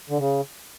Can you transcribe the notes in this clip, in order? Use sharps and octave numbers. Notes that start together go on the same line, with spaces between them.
D3
C#3